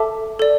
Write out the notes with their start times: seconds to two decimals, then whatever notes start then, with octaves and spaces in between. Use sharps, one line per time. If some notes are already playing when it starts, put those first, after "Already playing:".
Already playing: A4 E5 A5 D6
0.39 A4 D5